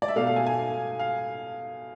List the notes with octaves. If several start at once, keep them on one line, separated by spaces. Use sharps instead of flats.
D5
E5
B2 A3 F5
F5
G#5
G#5
F5